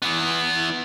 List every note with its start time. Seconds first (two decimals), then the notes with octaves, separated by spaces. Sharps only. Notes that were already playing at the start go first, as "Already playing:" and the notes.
0.02 E3 B3